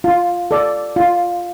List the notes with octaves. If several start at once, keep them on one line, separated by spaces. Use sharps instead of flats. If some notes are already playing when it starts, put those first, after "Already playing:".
F4
A4 D5
F4